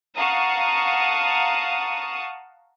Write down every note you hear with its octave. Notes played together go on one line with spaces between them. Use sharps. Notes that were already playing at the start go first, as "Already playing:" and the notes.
F5 F#5 A5 A#5 C#6 D#6